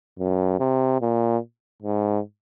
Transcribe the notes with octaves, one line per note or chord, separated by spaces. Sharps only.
F#2
C3
A#2
G#2